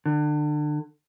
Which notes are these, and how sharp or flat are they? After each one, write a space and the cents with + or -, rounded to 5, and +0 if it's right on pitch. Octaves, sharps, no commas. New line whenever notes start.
D3 +30